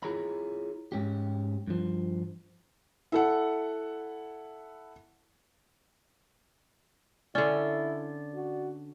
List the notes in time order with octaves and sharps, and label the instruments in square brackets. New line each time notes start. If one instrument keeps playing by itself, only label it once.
[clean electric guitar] E4 F4 G#4 C#5 A#5 B5
G#2 C#4 G4
G2 F3
[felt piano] E4 A4 F#5
[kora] D3 C#4 [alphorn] E4 [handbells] D5
[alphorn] F#4